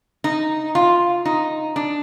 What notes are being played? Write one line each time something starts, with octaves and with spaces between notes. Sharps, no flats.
D#4
F4
D#4
D4